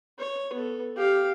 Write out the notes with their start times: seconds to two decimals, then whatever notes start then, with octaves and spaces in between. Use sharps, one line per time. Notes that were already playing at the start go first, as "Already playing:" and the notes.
0.19 C#5
0.53 B3 A4
0.96 G4 F5